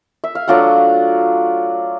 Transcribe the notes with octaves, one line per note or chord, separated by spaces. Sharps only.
E5
F5
F#3 A3 D4 F4 F#4 F#5